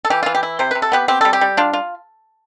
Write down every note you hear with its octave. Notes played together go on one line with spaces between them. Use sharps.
A4
E3 G4
E3 F4
G4
E4
C3 C5
C3 B4
A4
B3 G4 B4
C4 G4
G3 A4
G4
G3
D4 F4
F4